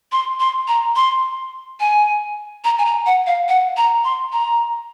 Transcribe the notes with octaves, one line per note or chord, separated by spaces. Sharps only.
C6
C6
A#5
C6
G#5
A#5
G#5
A#5
F#5
F5
F#5
A#5
C6
A#5